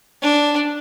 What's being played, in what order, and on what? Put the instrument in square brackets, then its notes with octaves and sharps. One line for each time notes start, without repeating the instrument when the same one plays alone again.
[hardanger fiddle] D4